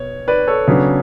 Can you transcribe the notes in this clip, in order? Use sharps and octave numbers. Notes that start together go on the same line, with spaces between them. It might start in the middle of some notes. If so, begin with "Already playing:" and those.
Already playing: B2 C#5
B4 D5
A4 C#5
C#3 F#3 B3 D4